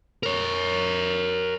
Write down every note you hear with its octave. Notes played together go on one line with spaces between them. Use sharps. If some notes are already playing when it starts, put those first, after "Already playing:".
A#4 C#5